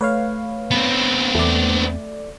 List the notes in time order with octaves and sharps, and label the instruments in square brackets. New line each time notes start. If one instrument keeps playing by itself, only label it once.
[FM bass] A3 [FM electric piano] B4 C#5 F5
[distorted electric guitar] B3 C4
[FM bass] E2 [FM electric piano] A3 D5